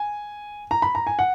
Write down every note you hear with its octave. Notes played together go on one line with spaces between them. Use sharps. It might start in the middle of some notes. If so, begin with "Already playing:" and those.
Already playing: G#5
A#5
B5
A#5
G#5
F#5